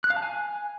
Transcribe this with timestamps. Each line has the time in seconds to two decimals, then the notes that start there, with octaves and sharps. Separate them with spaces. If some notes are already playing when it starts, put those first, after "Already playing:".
0.04 F#6
0.10 F5
0.16 A5
0.23 G#5